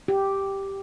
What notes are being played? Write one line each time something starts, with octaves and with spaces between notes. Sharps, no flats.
G4